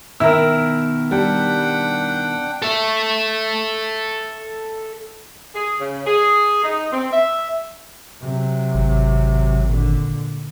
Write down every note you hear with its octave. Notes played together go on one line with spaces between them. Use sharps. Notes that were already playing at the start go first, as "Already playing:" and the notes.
B2 D#3 E4 A#4 E6
G3 D4 F#5 G5
A4 E5
G#4
C#3
G#4
D#4
C4
E5
C3 F#3
G#1
A#2 D3